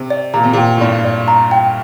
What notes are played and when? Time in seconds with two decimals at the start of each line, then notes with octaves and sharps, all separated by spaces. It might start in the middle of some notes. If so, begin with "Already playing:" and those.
Already playing: C3
0.10 D5
0.34 A#2 A#5
0.44 C3
0.53 A#2 G5
0.77 A2
0.81 G2 D5
1.05 D5
1.28 A#5
1.51 G5